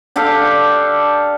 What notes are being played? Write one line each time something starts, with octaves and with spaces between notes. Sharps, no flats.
D4 G4 A4 F5